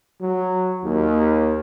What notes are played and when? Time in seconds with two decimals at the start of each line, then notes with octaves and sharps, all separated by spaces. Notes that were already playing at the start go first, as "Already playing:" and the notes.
0.21 F#3
0.84 D#2